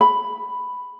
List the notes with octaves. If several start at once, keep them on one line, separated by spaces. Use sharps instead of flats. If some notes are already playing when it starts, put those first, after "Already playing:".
B5